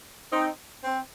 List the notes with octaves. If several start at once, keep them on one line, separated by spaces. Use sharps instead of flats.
C4 D#4
C4